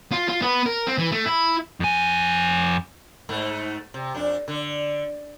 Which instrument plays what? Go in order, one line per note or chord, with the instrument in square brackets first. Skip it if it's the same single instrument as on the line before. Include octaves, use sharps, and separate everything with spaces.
[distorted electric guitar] F4
F4
B3
A#4
C4
E3
A3
E4
[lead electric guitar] F2 G#5
[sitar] G#2 A3
C3
F2 D4
D3